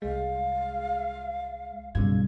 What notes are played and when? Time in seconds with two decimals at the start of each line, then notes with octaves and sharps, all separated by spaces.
0.02 C2 G#3 F5
1.95 B1 G2 C#3 G#6